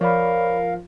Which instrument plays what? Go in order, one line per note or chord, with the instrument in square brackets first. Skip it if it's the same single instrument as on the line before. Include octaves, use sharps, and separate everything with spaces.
[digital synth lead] F3 [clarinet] A#4 [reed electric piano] C#5 D5 B5 [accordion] F5